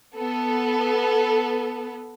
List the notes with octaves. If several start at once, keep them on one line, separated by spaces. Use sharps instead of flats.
B3 A4